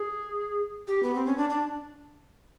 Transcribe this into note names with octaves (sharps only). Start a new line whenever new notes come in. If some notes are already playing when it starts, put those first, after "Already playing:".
Already playing: G#4
G4
B3
C4
C#4
D4
D4